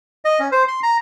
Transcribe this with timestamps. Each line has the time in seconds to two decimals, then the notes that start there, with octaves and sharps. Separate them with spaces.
0.25 D#5
0.39 C#4
0.52 C5
0.68 C6
0.83 A#5